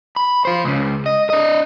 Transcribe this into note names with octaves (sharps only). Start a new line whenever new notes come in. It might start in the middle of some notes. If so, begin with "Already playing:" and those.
B5
F4 C5
C#2 C#3
D#5
D4 D#5